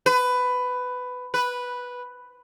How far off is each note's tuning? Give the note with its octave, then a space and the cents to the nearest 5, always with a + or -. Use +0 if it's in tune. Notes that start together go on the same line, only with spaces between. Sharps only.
B4 +15
B4 -5